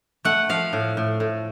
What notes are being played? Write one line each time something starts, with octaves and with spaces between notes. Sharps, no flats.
A3 F#5
F3 F5
A2
A2
A2